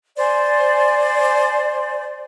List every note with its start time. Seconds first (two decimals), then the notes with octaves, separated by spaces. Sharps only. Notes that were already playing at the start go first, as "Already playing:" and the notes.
0.18 C5 D5 G#5